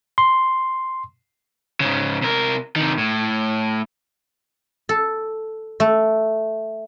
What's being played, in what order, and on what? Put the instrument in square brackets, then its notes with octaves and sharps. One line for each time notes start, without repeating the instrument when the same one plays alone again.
[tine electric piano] C6
[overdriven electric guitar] G#2 C#3
C3 A#4
C3 D#3
A2
[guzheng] A4
A3